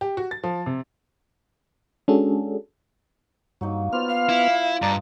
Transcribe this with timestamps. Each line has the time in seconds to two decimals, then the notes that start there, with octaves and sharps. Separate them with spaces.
0.01 G4
0.17 F#4
0.31 A6
0.43 F3
0.66 C3
2.08 G#3 C#4 D4 F#4 G#4 A4
3.61 G2 F#3 A#3 D#4
3.93 B3 F4 C5 D5 F6
4.09 F5
4.29 E4
4.82 G2 D5 D#5 A5 A#5